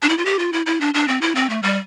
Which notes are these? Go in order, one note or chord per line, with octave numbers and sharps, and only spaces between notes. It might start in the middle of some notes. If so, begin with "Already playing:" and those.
D4
E4
F4
G4
F4
E4
E4
D4
D4
C4
E4
C4
A3
G3